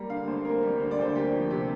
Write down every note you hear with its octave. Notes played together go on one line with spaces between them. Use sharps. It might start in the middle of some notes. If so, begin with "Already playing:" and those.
Already playing: G3 A#3 A#5
D3 F5
D2 C5
A#3 A#4
G3
D3 C5
D5
D2 C5
A#3 G4
F3
C3 G4